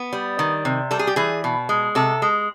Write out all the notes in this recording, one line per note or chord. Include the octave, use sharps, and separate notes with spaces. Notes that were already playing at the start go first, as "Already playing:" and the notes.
Already playing: B3
G3
D#3
C3
G3 A4
G#4
G4
E3 G#4
B2
G#3
C3 A4
G#3